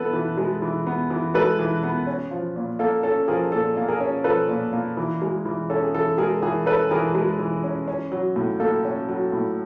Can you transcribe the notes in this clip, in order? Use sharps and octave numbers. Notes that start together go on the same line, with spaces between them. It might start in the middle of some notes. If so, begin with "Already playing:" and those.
Already playing: E3 B3 A4 B4
E3
G#3
E3
B3
E3
G#3 A4 B4
E3
B3
C#4
F3
A#2
A#3 A4
C#4 A4
F3 G#4 A#4
A#2 A4
A#3
G#4 A#4
C#4
F3 A4 B4
A#2
A#3
E3
G#3
E3
C#4 A4
G#4
E3 A4
G#3 G#4 A#4
E3 G#4 A#4
C#4 A4 B4
E3 G#4 A#4
G#3
E3
C#4
C#4
F#3
A2
A#3 A4
C#4
F#3
A2